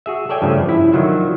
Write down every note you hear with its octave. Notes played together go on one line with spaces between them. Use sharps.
F#4 G#4 E5
A4 C#5 D5 E5 G5 G#5
G2 C#3 F3 A3 C#4
E4
D3 D#3 F3 F#3 F4 E5